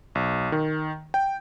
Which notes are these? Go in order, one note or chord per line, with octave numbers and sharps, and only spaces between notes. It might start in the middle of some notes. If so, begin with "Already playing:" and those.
B1
D#3
G5